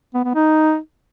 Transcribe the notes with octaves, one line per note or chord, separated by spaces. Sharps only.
B3
B3
D#4